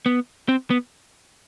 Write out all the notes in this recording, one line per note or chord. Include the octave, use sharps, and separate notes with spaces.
B3
C4
B3